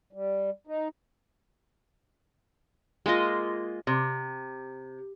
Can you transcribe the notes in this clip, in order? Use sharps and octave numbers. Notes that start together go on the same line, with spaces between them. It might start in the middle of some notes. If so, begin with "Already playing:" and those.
G3
D#4
G#3 A#3 F4 D#5
C3